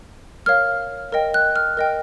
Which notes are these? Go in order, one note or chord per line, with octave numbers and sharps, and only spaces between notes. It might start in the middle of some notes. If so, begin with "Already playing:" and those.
A#4 C#5 F5 F6
A#4 D#5 G5
F#6
F6
A#4 D#5 G5